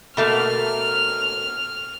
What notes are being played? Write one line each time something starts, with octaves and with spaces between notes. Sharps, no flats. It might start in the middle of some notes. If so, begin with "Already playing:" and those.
B2 A3 A#3 F6